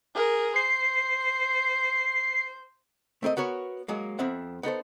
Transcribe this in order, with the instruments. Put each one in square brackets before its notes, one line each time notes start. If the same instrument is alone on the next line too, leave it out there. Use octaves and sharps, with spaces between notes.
[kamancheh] G#4 A#4
[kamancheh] C5 [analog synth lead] C7
[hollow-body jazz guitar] A3 C4 A#4 D#5
B3 F#4 A#4 C#5
F#3 G#3 A#3
F2 B3 C4 E5 F#5
B3 D#4 A4 C5